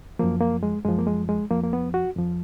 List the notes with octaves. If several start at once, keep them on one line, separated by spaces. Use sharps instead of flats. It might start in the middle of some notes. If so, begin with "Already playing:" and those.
F#2 F3 A#3
A#3
G#3
F#2 F3 G#3
A#3
G#3
G#3
F2 F3 A#3
A#3
B3
F#4
F2 F3